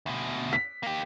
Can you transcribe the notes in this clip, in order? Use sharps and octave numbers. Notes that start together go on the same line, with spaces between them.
D2 B2
B6
A#3 G4